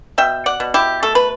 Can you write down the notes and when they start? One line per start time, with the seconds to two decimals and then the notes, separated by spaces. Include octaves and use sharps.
0.18 B2 E5 G5
0.46 D5 F#5
0.60 B2
0.74 E4 G4
1.03 A3 A4
1.15 B4